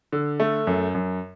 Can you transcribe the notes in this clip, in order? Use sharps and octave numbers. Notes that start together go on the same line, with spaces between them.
D3
A3
F#2
F#2